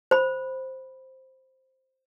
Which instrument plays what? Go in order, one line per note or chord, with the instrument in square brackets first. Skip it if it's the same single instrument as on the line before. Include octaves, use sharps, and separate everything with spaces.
[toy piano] C5 B5